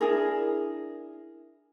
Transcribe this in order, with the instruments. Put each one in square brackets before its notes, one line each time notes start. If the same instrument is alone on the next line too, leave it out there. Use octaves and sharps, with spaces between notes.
[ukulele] D4 E4 G#4 A#4